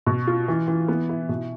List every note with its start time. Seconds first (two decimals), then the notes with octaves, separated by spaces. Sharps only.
0.07 B2
0.27 F4
0.48 E3
0.68 E3
0.88 B3
1.09 E4
1.29 B2